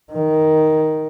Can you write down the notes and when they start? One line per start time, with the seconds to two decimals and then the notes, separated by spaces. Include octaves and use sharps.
0.12 D#3